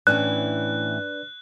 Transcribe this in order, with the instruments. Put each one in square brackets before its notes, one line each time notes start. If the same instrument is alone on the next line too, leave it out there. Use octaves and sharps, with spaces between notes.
[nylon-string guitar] A2 E3 C#4 [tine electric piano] D4 B4 D5 [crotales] F#6